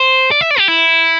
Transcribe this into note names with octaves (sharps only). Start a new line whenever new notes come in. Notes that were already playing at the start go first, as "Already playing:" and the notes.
Already playing: C5
D5
E5
D5
G4
E4